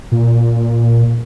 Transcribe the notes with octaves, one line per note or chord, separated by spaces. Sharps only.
A#2